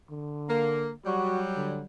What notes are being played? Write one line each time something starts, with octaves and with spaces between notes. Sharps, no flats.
D3
A#3
F#3 G3 F#4
D3